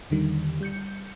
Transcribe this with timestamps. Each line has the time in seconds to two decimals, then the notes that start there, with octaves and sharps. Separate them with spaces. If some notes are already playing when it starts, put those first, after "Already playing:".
0.10 E2 D3 D#3 G3
0.60 G3 G6 C#7